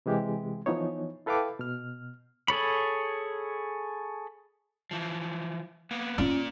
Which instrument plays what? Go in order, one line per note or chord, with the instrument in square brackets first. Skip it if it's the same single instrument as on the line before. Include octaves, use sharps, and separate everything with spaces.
[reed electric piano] C3 E3 G#3 G4
E3 F3 B3 D#4 C#5
E4 A4 B4 F5 G5 D6
B2 F6
[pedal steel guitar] G#4 A4 C#5 B5
[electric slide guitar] E3 F3
A#3 B3
[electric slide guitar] A#3 D5 [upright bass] C#4 F4